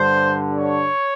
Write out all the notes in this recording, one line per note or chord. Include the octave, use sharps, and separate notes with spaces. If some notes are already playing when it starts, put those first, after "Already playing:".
Already playing: G2 D3 C5
C#5